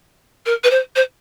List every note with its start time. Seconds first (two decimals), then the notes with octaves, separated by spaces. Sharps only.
0.46 A#4
0.64 B4
0.71 C5
0.96 C5